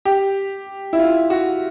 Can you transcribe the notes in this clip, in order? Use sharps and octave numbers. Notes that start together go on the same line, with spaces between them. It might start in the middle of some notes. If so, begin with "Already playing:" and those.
G4
E4
F4
F#4